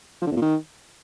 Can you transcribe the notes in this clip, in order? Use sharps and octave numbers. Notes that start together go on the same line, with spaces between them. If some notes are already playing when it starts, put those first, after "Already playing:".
F3
D3
E2
A#2
D#3